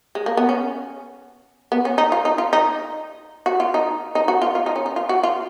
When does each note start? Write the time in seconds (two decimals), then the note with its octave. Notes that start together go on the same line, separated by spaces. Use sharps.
0.15 G#3
0.26 A#3
0.37 B3
0.49 C#4
1.72 B3
1.85 C#4
1.98 D#4
2.12 F4
2.25 D#4
2.38 F4
2.53 D#4
3.46 F#4
3.60 F4
3.74 D#4
4.15 D#4
4.28 F#4
4.42 F4
4.55 F4
4.66 D#4
4.76 C#4
4.86 D#4
4.96 F4
5.09 F#4
5.23 F4